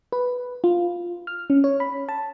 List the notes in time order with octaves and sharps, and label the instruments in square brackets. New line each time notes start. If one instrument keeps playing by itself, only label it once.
[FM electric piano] B4
F4
F6
C#4
C#5
B5
A5